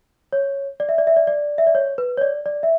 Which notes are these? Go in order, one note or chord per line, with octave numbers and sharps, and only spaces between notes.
C#5
D5
E5
D5
E5
D5
D5
E5
D5
C#5
B4
C#5
D5
D5
E5